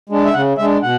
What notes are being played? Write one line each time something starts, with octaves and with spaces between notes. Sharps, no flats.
G#3 D4
E5
C#3 F#5
G#3 D4 E5
B2 F#5